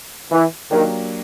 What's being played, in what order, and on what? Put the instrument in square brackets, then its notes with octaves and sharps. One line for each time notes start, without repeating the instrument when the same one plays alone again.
[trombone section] E3
[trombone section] D#3 [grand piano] F#3 A#3 D4 G4